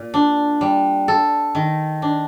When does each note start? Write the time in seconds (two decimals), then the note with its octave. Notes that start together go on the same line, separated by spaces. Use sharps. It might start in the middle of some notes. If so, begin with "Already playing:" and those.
Already playing: A#2
0.14 D4
0.61 G3
1.08 A4
1.55 D#3
2.02 D4